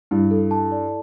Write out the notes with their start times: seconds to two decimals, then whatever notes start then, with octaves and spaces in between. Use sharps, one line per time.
0.11 G2 E4
0.31 A4
0.51 A5
0.72 D5